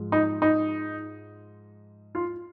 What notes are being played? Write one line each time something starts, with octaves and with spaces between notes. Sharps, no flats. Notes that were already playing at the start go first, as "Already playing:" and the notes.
Already playing: G#2 F3 G#3
D#4
D#4
F4